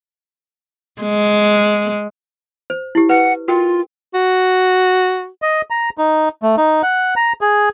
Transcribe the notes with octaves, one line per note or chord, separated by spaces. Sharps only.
G#3
C5
E4 G4
B4 F#5
F4 F#4 A#4 G5
F#4
D#5
A#5
D#4
A3
D#4
F#5
A#5
G#4